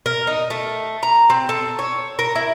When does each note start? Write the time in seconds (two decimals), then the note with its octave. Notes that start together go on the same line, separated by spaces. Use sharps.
0.06 A#4
0.27 D#4
0.50 A3
1.03 A#5
1.30 C4
1.49 A4
1.79 C#5
2.19 A#4
2.35 E4